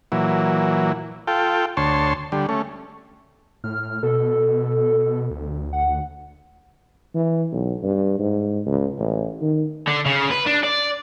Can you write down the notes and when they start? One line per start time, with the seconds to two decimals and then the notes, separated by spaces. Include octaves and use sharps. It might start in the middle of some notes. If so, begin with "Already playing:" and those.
0.12 A#2 E3 F#3
1.27 F4 A4 G5
1.77 D2 C#5 A5 C6
2.32 D3 G3
2.49 A3 C#4
3.64 A2 F6
4.03 B2 A4
5.31 D2
5.73 F#5
7.14 E3
7.52 B1
7.83 G2
8.19 G#2
8.66 C#2
8.99 A1
9.41 D#3
9.88 D3
10.06 C#3
10.30 B4
10.46 D4
10.63 D5